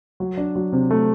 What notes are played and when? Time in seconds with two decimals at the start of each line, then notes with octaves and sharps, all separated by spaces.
0.20 F#3
0.37 D4
0.55 F#3
0.73 C3
0.91 A3